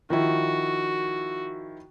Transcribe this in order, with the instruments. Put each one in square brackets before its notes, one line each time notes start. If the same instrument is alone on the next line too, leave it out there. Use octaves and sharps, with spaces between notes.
[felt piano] D#3 F3 E4 [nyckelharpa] F#4